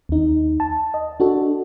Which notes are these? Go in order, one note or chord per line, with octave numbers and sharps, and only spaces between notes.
D#2 D#4
A5
D#5
D4 F#4 A4